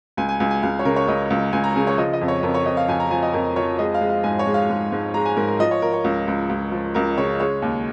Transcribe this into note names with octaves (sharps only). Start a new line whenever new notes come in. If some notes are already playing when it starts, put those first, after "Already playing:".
C#2 G#5
G#5
C#2 G#5
G#5
C#2 F5
C#5
C#3 A#4
C#5
C#2 D#5
C#2
C#2 G#5
A#5
C#3 G#5
C#5
F3 D#5
D#5
F2
C#5
F2 A#4
C#5
F2 D#5
F5
F2 G#5
A#5
F3 G#5
D#5
F2 A#4
F3 C#5
G#3 D#5
F5
G#3
F5
G#2 G#5
C#5
G#3
F5
G#2
G#2
G#3 A#5
G#5
G#2 A#4
A#4
F3 D#5
C#5
F3 A#4
C#5
C#2
C#2
C#2
F3
C#2 A#4
C#3 C#5
G#3 C#5
D#2